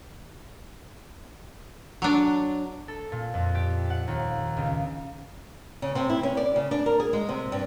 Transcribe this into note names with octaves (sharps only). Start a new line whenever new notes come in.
F#3 D4
A4
A#2
F2
G4
F#5
D#2
C#2
C#3
C3
E4
C#4
D5
C#3
D4
A#4
G#4
G#3
C3
G2